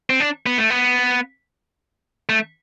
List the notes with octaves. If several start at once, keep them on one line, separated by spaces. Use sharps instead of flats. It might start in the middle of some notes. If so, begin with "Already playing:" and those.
C4
D4
B3
A3
B3
A3